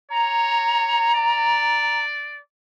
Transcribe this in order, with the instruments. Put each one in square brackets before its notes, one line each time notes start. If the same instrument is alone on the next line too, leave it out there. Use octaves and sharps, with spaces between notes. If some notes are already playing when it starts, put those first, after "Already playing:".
[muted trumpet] C#5 [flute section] A#5
[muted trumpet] D5